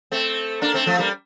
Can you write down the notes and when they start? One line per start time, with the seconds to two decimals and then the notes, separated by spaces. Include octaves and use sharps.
0.12 A3 C4
0.61 A#3 D4
0.74 A3 C4
0.86 F3 A3
0.99 G3 A#3